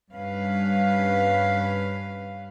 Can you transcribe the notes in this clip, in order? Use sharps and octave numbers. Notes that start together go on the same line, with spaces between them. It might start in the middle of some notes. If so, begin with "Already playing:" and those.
G2 C#4 B4 F5